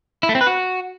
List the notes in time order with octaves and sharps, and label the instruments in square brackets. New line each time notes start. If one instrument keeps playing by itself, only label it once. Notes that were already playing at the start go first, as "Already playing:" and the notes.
[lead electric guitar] E4
A3
C4
B4
F#4